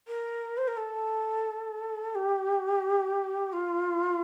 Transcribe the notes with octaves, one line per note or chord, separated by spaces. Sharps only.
A#4
C5
A#4
A4
G4
F4